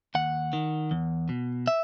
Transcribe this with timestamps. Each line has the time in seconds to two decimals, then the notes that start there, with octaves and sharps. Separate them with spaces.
0.15 D#2 F#5
0.53 D#3
0.91 E2
1.29 B2
1.67 E5